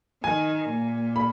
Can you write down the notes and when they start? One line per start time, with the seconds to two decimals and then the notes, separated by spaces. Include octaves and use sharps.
0.24 D#3 G#5
0.69 A#2
1.16 B5